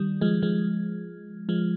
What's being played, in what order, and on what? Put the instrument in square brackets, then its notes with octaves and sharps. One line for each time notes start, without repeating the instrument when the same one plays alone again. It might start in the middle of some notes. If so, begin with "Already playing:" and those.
Already playing: [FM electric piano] D#3 G3
F3 G#3
F3 G#3
F3 G#3